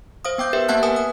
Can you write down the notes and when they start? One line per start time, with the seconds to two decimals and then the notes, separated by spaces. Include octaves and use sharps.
0.25 C5 F5 D#6
0.38 B3 G5 D6 G6
0.53 G4 A#4 B4 E5
0.69 A#3 B3 E5 F#5 A5 F#6
0.83 A#4 B4 F#5 G#5 D#6
0.96 D#6